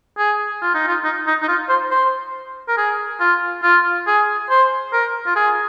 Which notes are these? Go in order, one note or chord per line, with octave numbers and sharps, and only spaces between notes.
G#4
F4
D#4
F4
D#4
D#4
D#4
F4
C5
C5
A#4
G#4
F4
F4
G#4
C5
A#4
F4
G#4